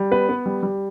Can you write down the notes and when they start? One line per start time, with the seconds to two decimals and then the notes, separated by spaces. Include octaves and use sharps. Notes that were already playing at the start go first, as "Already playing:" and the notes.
Already playing: G3
0.11 B3 B4
0.29 B3
0.46 G3
0.63 G3